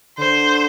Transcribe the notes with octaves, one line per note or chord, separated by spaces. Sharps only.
D3 C5